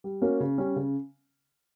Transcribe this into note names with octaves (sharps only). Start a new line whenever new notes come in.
G3
A#3 C#4 F#4 C#5
C#3
G3 C#4
C#3